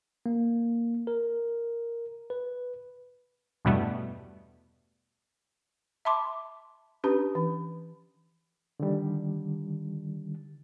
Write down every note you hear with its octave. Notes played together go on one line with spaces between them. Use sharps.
A#3
A#4
B4
E2 G2 B2 G3 A3 B3
E5 A5 B5 C6 D6
C#4 D4 G4 B4 B5
E3
D3 D#3 G3